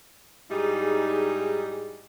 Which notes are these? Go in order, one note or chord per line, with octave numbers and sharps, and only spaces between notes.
G#2 G3 D#4 E4 G#4